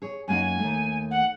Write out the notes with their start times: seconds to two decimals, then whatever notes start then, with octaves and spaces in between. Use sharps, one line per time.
0.02 G#4 C#5
0.28 F#2 A#3 D#4 G#5
0.59 D#2 A3
1.11 F#5